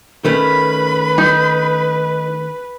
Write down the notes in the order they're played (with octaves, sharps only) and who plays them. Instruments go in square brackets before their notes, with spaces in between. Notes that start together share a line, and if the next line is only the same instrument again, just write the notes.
[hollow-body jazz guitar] D#3 A3 C#4 [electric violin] B4 [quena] B5
[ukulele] D#4